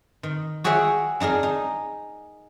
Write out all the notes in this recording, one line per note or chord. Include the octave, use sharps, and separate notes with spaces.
D#3
F#4 G#4 C#5 E5 G5
D4 D#4 G#4 A#4
D#4